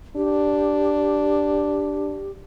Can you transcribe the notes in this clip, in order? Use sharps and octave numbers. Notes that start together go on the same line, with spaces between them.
D4 G4